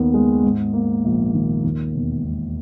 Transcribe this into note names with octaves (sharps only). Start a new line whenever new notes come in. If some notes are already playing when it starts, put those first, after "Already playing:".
Already playing: D#2 D#3 B3
G#3
G#2
A#3
A#1
D#3
D#2
E1
E1